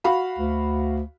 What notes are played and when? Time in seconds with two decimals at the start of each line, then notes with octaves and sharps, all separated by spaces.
0.04 F#4 F5 B5
0.39 D2